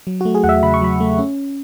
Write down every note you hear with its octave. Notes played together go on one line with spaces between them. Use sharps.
F#3
F#4
A3
G#4
E2 F#5
E5
C#3 B5
C#6
F#3 B5
A3
C#4